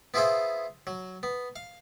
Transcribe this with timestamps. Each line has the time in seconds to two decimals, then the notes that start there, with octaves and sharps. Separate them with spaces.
0.14 B3 E4 F4 G#4 C5 E5
0.87 F#3
1.23 B3
1.56 F5